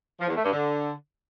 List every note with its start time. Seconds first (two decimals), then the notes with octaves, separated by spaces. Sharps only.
0.20 F3
0.28 E2
0.36 A3
0.44 G2
0.52 D3